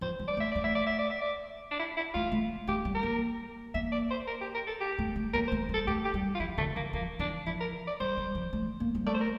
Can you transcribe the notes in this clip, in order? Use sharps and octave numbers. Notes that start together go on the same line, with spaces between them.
F3 C5
G3
D5
A3
E5
A3 D5
E5
D5
E5
D5
E5
D5
D4
E4
E4
A3 F4
A3
A3 G4
G3
A#4
A#3
A#3 E5
D5
C5
A#4
G4
A#4
A4
G4
A3
A3
A#3 A#4
C5
A3
G3
A4
A3 G4
G4
G3
F4
F3 E4
D3 A3
F3 A#3
F3 A#3
E3 D4
F3 E4
A#4
D5
G3 C5
G3
F3
A3
A#3
G3
A3 D5
C5
A#4